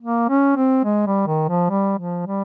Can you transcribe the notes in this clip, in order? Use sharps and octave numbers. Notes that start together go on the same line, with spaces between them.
A#3
C#4
C4
G#3
G3
D#3
F3
G3
F3
G3